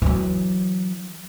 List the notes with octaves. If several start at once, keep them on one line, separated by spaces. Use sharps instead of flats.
E3 F#3